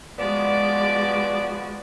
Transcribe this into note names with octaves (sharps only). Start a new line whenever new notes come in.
F3 G#3 B3 F#4 D5